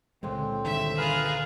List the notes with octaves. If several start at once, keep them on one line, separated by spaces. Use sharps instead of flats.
C#2 A#2 D3 G#3 C4
G2 D#3 E5 E6 G6
F4 G#4 A#4 B4 F5